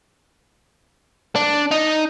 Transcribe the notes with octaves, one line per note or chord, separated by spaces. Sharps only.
D4
D#4